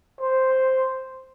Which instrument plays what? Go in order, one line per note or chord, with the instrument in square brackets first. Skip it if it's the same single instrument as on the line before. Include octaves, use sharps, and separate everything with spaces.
[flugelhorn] C5